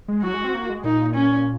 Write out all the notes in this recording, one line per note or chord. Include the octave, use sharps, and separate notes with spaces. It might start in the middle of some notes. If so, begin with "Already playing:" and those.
G#3
F#3 F#4
G#3
C4
A#3
G#3
A#2 D#4
C#4